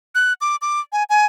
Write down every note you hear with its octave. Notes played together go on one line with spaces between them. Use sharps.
F#6
D6
D6
G#5
G#5